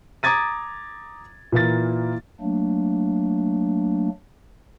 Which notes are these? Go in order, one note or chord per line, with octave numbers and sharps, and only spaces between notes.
A#5 D6 D#6 G#6 A6 D#7
A#2 E3 A#3 A6
F#3 A3 A#3 D4